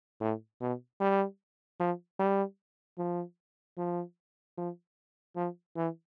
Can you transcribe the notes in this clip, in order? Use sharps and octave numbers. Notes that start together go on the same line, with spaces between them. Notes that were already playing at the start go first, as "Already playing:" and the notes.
A2
B2
G3
F3
G3
F3
F3
F3
F3
E3